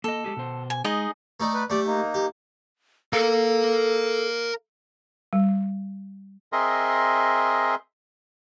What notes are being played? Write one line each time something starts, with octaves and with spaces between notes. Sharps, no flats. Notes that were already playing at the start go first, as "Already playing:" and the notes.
A#3 A4 D#5
G#3 G4 G#4
B2 C5
G#5
G#3 D#4 G#4 D#5
A3 D#4 D5
B4
A3 G4 D5
A#3 D#4
G4
A4 A#4 F5
G3
C4 G#4 A#4 D#5 E5 C6